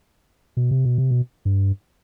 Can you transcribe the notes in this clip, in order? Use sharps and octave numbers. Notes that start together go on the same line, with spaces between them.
B2
C3
B2
C3
B2
G2